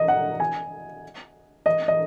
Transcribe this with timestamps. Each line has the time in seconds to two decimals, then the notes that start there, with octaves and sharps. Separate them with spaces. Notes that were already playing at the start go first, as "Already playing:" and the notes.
Already playing: D#5
0.08 F#5
0.40 G#5
1.66 D#5
1.88 D#5